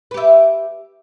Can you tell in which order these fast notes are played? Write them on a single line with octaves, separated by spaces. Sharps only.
B4 G4 E5